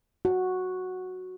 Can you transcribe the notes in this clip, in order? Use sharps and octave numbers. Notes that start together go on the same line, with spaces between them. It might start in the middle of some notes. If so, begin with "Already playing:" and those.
F#4